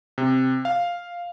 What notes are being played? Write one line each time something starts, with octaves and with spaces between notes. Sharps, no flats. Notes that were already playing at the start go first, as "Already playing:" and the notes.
C3
F5